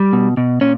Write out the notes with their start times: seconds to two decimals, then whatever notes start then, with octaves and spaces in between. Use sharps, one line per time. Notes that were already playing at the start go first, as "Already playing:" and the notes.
Already playing: G3
0.13 B2
0.37 B2
0.61 A#2 C#4